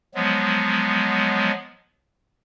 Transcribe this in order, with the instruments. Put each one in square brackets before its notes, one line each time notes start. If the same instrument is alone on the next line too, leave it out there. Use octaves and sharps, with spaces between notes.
[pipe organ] F3 F#3 G#3 B3